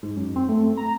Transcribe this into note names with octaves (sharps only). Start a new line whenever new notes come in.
G#2
F#2
C4
A3
A#5